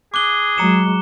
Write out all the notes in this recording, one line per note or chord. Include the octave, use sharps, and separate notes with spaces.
G#4 D6 F#6 G7
F#3 G#3 A#5 C#7 E7